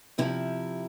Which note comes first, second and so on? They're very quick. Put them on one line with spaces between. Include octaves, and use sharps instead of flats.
C3 E3 E4 F3